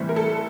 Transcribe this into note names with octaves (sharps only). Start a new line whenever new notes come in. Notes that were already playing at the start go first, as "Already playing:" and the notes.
Already playing: A2 E3 G3 C4
A#4
A4